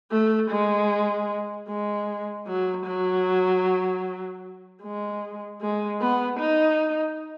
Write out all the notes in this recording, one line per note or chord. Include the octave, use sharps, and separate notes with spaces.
A3
G#3
G#3
F#3
F#3
G#3
G#3
B3
D#4